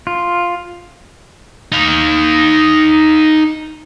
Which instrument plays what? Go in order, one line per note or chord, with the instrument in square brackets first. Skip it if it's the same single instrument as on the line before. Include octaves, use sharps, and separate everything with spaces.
[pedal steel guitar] F4
[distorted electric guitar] D#4 F5